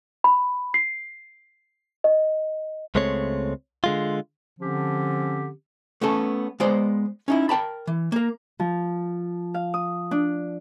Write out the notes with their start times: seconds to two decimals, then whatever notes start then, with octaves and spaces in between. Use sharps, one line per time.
0.24 B5
0.74 C7
2.04 D#5
2.95 C#2 G#3 A3 C4 C#5
3.84 D3 G#3 F4
4.60 D3 F3 C4 C#4 G4
6.01 A3 B3 C#4 A4
6.60 G#3 B3 C5 D5
7.28 C#4 D#4 E4
7.49 A#4 G5 A5 B5
7.87 E3
8.12 A#3 A#4
8.60 F3
9.54 F5
9.74 D#6
10.11 D4